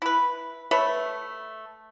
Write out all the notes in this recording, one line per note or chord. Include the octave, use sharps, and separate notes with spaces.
E4 B4
A3 B4 C#5 E5